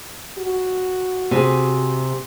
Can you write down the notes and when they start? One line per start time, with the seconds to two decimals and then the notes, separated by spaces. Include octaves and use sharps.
0.38 F#4
1.31 C3 G#4